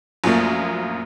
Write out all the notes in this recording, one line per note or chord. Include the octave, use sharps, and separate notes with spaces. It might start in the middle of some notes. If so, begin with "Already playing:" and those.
A#1 F#2 F3 A3 A#3